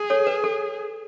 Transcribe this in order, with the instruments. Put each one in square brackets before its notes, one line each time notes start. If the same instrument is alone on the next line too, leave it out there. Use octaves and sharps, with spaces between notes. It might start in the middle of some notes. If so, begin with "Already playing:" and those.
Already playing: [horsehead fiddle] G#4
[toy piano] A4 C#5
B4
A4